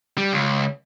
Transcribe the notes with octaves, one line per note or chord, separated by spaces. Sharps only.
G3
C#2